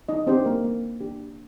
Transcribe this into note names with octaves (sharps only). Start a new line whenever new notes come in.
D#4 D#5
C4 D4 G4 C5
A#3 A#4
A#3
D4 G4